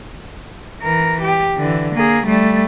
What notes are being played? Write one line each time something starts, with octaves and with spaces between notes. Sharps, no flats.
E3 A#4
G4
D3 E3
A#3 G#4
G3 A3